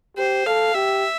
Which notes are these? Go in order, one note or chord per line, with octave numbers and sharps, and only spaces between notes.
G4 C5
A4 F5
G4 E5